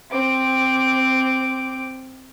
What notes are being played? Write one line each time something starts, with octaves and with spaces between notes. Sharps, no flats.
C4 D6